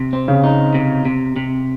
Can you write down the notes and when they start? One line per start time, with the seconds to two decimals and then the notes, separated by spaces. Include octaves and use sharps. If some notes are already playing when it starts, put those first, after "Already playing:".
Already playing: C3
0.13 C4
0.28 C#3
0.44 D#4
0.75 C3
1.06 C3
1.36 C3